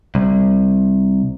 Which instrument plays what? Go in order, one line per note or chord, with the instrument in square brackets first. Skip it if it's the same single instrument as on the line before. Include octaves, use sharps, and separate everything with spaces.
[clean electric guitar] C2